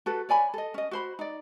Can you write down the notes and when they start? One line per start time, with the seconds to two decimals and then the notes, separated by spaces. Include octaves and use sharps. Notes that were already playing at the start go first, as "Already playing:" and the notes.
0.06 F#4 A4 B4
0.29 C#5 D5 G#5 B5
0.54 A4 D#5
0.74 C#4 D#5
0.91 F#4 C5 B5
1.19 D#4 D5